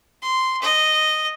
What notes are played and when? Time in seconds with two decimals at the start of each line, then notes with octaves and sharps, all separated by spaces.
0.22 C6
0.62 D#5